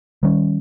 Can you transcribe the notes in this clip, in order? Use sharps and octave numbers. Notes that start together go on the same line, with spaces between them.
D#3 G3 C#4